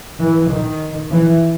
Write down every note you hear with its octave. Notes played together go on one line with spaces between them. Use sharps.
E3
D#3
E3